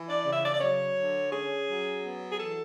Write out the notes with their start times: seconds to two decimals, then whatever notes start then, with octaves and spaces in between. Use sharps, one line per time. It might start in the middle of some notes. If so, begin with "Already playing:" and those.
Already playing: E3
0.08 D5
0.25 C#3
0.33 E5
0.43 D5
0.54 D5
0.61 F#3 C#5
0.97 D3
1.32 C#4 G#4
1.68 F#3
2.03 B3
2.32 G#4
2.40 E3 A4